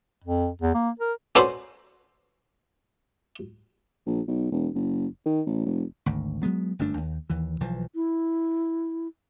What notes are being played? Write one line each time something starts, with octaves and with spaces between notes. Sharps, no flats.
F2
E2
A#3
A#4
C#4 F#4 A4 B4 C5 D5
A#1
B1
E1
F#1
D#3
A1
F1
G#1 D2
F#3 G#3 B3
G1 F#2 A3 D4
D#2
D#2 E3
B1 E3 F3
E4